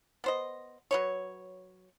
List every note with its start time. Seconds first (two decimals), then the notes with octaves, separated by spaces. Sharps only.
0.24 B3 C5 D#5
0.91 F#3 B4 C#5